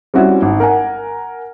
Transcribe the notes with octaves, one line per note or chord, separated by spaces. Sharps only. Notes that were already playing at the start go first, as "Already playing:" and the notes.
G3 C4 C#4 E4 F#4
G#1
A#4 F#5 G#5